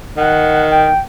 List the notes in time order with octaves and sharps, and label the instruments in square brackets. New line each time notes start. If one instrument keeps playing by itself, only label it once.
[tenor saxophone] D#3 [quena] F#5
[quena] G5